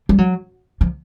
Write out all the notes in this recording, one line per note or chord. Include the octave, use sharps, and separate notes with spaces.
G3
F#3
F3